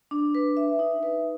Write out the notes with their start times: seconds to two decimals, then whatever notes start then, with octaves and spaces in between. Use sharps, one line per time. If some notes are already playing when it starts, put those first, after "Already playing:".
0.11 D4
0.35 B4
0.57 E5
0.79 D#4
1.03 B4